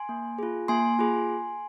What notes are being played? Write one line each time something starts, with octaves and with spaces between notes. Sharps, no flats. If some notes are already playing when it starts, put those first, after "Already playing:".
Already playing: G#5 C6
A#3
F4 G#4
A#3 G#5 C6
F4 G#4